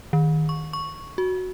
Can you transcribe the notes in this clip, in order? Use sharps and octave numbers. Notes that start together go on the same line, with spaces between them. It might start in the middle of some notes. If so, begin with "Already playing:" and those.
D#3
C#6
C#6
F#4